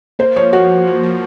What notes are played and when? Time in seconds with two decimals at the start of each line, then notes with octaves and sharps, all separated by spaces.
0.19 A#3 C5
0.36 F3 C#5
0.53 F3 F#4
0.70 F3
0.87 F3
1.03 F3